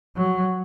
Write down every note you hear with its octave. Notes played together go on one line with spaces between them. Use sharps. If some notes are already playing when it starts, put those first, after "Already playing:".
F#3